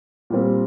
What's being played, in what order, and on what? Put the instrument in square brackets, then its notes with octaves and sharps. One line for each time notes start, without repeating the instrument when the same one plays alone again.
[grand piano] A#2 G3 C4